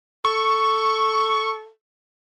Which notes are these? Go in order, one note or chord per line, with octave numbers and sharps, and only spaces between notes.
A4 C#6